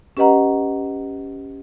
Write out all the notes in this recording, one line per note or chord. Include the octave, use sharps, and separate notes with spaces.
C#4 G4 B4 D#5 F#5 A#5